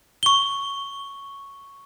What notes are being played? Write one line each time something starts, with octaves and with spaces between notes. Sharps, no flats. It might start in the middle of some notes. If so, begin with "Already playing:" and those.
C#6 G7